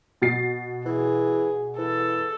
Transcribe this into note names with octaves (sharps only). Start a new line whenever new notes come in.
B2 A6 C7
E3 G#4
E3 A4